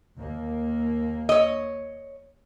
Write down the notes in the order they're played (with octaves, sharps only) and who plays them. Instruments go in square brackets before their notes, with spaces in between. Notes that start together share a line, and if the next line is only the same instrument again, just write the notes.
[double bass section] D#2 A#3
[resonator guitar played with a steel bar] C#5 D#5